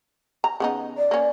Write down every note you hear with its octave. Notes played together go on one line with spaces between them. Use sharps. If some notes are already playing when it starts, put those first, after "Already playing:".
A#5
C#3 B3 D#4
D5
A#3 C#4